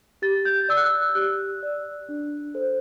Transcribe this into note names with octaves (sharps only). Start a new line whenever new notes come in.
G4 A6
G6
D5 E6
F#6
E6
G4 F#6
D5
D4
A4 C5